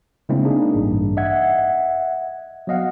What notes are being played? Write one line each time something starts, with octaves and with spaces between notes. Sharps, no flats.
C#3 G#3 A#3 C4 D4 E4
A#3 D4 D#4 G#4
A1 G2
D#5 E5 F#5 G#6
F#3 B3 D#5 F5 F#5